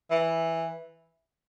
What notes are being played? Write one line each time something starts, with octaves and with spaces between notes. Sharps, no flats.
E3